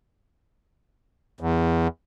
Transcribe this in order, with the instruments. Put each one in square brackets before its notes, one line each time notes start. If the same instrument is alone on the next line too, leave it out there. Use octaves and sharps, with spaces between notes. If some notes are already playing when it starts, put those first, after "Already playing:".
[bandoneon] E2